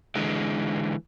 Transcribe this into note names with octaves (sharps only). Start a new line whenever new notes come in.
D3 E3 G#3